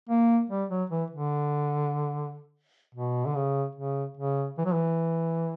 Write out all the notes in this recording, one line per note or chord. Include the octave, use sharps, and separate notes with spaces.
A#3
G3
F#3
E3
D3
B2
D3
C#3
C#3
C#3
E3
F#3
E3